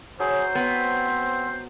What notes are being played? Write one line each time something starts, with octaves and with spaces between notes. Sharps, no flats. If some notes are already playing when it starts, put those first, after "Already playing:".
F#3 G#4 C5
B3 C4